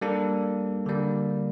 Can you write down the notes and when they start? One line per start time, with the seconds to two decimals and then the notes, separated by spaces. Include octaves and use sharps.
0.01 G3 A#3 D4 A4
0.86 D3 G3 A#3